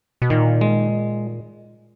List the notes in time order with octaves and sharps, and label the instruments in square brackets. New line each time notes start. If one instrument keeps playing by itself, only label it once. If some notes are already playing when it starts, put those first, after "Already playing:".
[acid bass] B2
[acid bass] A#2 [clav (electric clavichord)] D#3
[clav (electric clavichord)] G#3